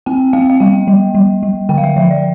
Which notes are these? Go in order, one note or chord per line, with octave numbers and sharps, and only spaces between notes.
C4 G5
C4 F5
F5
G3 G5
G3
G3
G3
D3 G5
F5
E5
F3 E5
D5